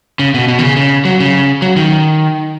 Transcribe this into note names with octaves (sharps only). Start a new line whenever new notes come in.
C#3
B2
B2
D#3
C#3
C#3
F#3
C#3
F#3
D#3